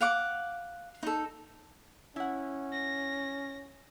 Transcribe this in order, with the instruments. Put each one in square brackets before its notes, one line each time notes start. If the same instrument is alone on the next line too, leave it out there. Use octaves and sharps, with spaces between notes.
[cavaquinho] F5 F#5 D6
D#4 A4
[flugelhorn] C#4 [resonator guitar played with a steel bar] E4 F#5
[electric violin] A#6